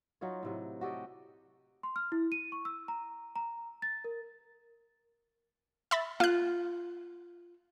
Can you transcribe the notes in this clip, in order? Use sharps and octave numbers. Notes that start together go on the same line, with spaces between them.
F#3 D#4 F4 C#5
A2 C3 F#3
F#4 G4 A4 D#5
C6
F6
E4
D#7
C#6
E6
A#5
A#5
A6
A#4
E5 B5 A6
F4 F5 F#6